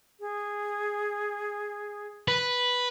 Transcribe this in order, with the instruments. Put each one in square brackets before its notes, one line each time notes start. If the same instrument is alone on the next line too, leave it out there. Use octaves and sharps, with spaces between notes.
[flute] G#4
[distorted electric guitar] B4